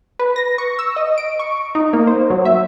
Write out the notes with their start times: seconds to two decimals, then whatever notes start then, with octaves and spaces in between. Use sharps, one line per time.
0.19 B4
0.36 A#6
0.58 C#6
0.79 E6
0.96 D#5
1.18 D7
1.39 C#6
1.75 D#4
1.93 A#3
2.07 C5
2.30 F#3
2.45 E5